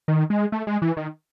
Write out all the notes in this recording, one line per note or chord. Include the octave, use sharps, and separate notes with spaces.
D#3
G#3
A3
G#3
E3
D#3